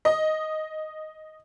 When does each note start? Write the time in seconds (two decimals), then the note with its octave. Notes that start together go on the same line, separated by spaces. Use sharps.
0.05 D#5